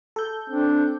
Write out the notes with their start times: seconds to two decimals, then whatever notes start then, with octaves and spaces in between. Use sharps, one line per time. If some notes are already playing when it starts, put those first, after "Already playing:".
0.16 A4 G6
0.50 C4 D4